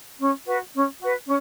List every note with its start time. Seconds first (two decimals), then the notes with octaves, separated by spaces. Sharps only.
0.19 C#4
0.45 F#4 B4
0.72 C#4
0.98 F#4 B4
1.24 C#4